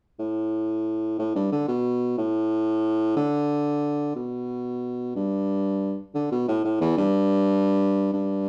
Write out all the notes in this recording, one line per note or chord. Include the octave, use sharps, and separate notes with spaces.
A2
A2
G2
D3
B2
A2
D3
B2
G2
D3
B2
A2
A2
E2
G2
G2